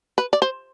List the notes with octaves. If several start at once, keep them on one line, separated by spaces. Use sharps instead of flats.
B4
D5
C5